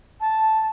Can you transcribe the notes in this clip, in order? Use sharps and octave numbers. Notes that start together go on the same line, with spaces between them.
A5